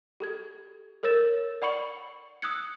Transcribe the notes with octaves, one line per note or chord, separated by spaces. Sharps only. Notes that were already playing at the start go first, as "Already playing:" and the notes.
G4 A4 G#6
A4 A#4 C#5 E6 A6 E7
D5 F#5 B5 C#6 C#7 F#7
D#6 E6 F#6 G#6 C#7